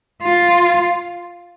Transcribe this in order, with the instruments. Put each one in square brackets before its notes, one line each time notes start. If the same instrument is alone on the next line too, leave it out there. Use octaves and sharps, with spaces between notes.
[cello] F4